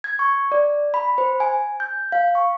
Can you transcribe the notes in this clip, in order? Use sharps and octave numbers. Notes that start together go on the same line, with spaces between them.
G#6
C#6
D5
B5
C5
G#5
G6
F5
C#6